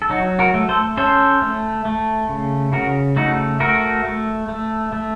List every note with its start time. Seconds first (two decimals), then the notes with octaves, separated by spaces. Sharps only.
0.02 A4
0.10 F#3 D#4 F#4
0.39 F#4 A#4
0.54 A3
0.69 A4 C5
0.97 C#4 A4 C5
1.42 A3
1.85 A3
2.29 C#3
2.72 C#3 F#4 A#4
3.16 A3 D#4 F#4
3.60 A3 F#4 A#4
4.05 A3
4.48 A3
4.93 A3